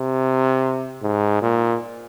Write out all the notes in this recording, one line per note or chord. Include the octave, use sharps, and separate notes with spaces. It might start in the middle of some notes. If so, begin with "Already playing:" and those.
Already playing: C3
G#2
A#2